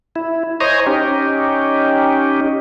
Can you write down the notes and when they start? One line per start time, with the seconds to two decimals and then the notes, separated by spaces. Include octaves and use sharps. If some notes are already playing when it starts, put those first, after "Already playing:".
0.16 E4
0.61 C5 C#5 D#5 G#5 A#5
0.86 C#4 D#4 G4